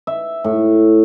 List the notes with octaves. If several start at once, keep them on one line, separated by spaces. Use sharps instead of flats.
E5
A2